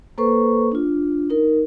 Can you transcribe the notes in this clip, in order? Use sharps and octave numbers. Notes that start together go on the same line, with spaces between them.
A#3 A4 B4 C5 C#6
D4 F4
D#4 A#4